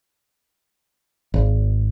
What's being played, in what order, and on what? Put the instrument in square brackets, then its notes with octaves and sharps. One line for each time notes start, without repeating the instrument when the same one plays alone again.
[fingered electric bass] G#1